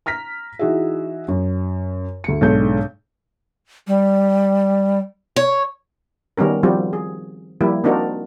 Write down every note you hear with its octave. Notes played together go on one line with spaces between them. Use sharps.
A#5 F6 A#6 B6
E3 D#4 F#4 G#4 E5
F#2
D2 C#7
B1 G#2 G#3 D4 A4 G6
G3
C#5
D#3 G3 B3 C#4 A#4
F3 G3 C4 F4 F#4
G#4
F3 G3 A#3 E4
A#3 C4 D4 D#4 F#4 A#4